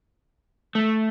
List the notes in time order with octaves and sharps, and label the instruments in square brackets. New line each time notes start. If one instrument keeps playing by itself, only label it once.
[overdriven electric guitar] A3